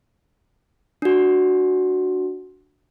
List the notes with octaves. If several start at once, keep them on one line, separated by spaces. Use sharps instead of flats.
D4 F#4